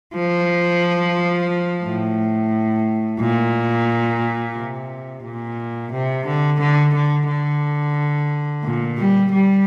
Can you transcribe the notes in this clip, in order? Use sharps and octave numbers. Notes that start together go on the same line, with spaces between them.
F3
A2
A#2
C3
A#2
C3
D3
D3
D3
D3
A#2
G3
G3